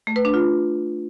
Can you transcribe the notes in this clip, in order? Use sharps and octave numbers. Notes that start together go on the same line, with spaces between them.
A3
B4
D4
F4